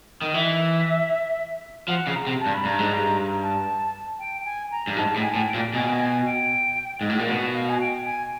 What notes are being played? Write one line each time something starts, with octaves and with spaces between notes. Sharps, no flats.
D#3
E3 E5
F3 F#5
C#3
A#5
C3
A5
G2
B5
G2 A#5
G#2
G2
A5
G5
G#5
A#5
G2
G#2 A5
A2
G#5
A2
G5
A#2
B2 G#5
G#5
G5
G#2
A2
A#2
B2 F#5
F5
G#5
G5
G#5